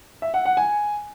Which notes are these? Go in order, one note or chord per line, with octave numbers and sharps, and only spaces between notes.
E5
F#5
F#5
G#5